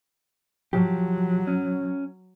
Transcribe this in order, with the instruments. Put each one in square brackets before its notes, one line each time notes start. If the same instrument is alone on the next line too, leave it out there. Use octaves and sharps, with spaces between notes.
[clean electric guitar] F3 G4 [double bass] F#3
[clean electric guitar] C#4